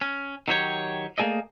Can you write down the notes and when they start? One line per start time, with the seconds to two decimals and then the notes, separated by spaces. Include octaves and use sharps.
0.01 C#4
0.48 D#3 F#3 G4 C#5
1.18 A3 A#3 G#4 D5 D#5